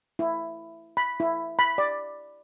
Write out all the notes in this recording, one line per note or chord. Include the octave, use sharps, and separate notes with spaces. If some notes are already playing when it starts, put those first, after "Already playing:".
E4
B5
E4
B5
D5